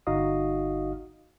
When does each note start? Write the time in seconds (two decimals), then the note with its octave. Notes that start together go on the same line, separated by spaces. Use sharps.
0.07 G1 D#4 F#4 D#5 F5 D#6